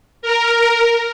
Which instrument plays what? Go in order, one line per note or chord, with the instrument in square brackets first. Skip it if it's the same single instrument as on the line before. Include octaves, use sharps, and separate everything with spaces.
[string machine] A#4